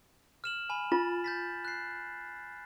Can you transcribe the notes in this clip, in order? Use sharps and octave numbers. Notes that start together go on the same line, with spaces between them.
F6 E7 F#7
G#5 B5
F4 A6
G6 A6 B6
F#6 C7